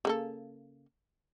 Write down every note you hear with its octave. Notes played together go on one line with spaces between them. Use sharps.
C#3 A#3 A4